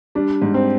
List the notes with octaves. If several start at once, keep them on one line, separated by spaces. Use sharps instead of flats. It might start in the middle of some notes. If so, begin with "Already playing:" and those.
G3 D4
G#2
C4